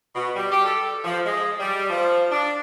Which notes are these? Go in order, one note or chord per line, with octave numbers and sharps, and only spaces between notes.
B2
G3
G4
A4
F3
G#3
G3
F3
D4